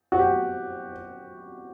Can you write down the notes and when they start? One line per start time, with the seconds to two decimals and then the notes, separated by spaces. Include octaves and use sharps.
0.12 F#4
0.19 G4